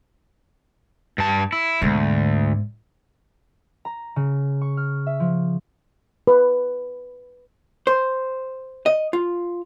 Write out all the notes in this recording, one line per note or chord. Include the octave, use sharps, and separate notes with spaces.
G2 A5
E4
D2 G#2 B2
A#5
C#3
C#6
F6
E5
F3
B4
C5
D#5
F4